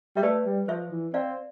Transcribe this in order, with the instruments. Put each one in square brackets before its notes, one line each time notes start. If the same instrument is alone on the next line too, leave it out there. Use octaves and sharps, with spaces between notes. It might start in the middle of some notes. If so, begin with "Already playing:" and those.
[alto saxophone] G3 [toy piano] E5
[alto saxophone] A3 [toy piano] B4 D5
[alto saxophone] G3
[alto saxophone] F3 [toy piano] C5 E5
[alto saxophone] E3
[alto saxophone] C4 [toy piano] D5 F5